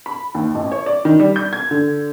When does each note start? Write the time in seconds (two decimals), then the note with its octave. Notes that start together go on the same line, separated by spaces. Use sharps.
0.06 B5
0.34 D#2
0.55 A1
0.72 C#5
0.86 D5
1.05 D#3
1.20 G3
1.36 G6
1.53 G#6
1.71 D3